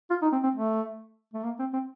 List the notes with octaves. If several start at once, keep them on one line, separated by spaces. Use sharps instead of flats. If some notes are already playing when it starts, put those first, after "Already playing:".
F4
D#4
C4
C4
A3
A3
A#3
C4
C4